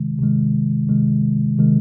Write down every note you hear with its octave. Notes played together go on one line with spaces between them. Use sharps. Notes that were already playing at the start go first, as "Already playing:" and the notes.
Already playing: C3 D#3 G#3
C3 D#3 G#3
C3 D#3 G#3
C3 D#3 G#3